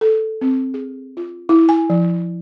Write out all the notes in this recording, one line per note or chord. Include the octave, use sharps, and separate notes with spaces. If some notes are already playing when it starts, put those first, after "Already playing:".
A4
C4
G#4
F4
E4
G#5
F3